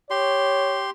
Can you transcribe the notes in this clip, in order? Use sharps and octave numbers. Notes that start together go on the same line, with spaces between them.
G4 C#5 C6